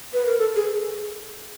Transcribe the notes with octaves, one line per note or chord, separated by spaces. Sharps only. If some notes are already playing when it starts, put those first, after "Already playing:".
B4
A#4
A4
G#4